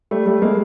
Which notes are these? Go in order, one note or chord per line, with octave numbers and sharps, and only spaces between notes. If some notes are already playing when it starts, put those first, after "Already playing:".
G3 A3
G3 A3
G#3 A#3